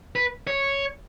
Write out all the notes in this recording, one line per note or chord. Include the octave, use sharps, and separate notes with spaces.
B4
C#5